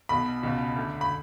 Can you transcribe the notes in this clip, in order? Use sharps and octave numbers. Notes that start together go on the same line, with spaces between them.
B1 B2 B5
C#2 B2
D2 D3
B5